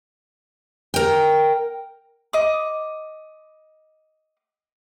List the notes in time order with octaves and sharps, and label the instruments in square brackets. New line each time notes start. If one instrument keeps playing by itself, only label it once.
[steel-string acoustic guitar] A#4 G5
[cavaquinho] D#5 D6